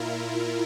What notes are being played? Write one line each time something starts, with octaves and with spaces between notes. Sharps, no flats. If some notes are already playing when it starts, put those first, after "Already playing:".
Already playing: A#2 E4 F4 A#4